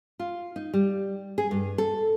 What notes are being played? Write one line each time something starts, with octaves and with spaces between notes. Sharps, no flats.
F4
D#4
G3
G#4
G2
A4